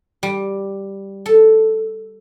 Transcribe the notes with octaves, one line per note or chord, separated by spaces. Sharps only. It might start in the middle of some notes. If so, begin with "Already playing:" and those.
G3
A4